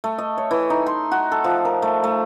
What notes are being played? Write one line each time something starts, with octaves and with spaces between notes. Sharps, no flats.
A3
D#5
C#5
E3
D#4
C6
F#4
A4
F3
A#4
A3
A3